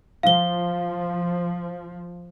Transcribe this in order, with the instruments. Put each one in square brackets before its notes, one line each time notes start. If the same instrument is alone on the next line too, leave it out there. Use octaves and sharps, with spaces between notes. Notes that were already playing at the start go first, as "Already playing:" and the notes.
[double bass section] F3 [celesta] F5 G7